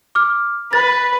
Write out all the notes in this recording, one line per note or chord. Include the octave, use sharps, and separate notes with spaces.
D6 F6
B4 A6